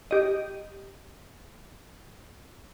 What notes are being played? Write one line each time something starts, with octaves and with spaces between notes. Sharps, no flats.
G4 D#5